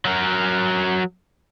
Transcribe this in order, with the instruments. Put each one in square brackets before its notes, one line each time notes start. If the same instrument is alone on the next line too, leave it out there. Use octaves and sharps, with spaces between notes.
[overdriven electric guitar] F#3 A#4